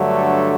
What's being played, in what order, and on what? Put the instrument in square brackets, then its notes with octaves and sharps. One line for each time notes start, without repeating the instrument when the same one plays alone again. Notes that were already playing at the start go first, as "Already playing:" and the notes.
Already playing: [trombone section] G2 D3 F#3 A3